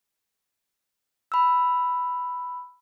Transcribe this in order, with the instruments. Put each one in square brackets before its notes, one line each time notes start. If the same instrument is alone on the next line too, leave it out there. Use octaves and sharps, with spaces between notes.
[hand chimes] B5 E6